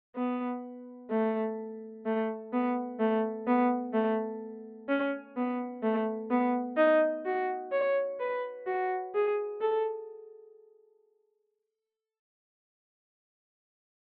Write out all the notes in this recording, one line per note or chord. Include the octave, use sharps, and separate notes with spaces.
B3
A3
A3
B3
A3
B3
A3
C#4
B3
A3
B3
D#4
F#4
C#5
B4
F#4
G#4
A4